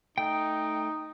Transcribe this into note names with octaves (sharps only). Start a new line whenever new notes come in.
A3 D#4 G5